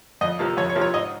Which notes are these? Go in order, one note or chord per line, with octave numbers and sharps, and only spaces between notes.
F2 D#5
C3 F3 A#3
F2 C#5
C#5
C3 F3 A#3
C#5
G#2 D#5